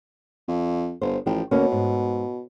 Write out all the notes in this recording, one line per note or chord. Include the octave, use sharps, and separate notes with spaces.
F2
G1 C5
A1 F3 G5
D2 B2 A#3 C#4
G#2